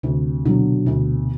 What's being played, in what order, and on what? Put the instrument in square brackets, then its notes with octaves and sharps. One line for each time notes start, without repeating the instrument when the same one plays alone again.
[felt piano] D2 [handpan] C3
[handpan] B2 [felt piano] D3 F#3
[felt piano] D2 [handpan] B2